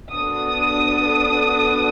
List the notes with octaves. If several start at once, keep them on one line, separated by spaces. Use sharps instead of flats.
B3 D4 F#4 A4 D#6